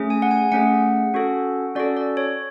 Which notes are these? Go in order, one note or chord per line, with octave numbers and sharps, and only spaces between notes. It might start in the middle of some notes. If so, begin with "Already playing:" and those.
Already playing: A3 C#4 G#4
G#5
F#5
G#5
A3 C#4 G#4 F#5
C#4 F#4 A4
C#4 F#4 A4 D5
D5
C#5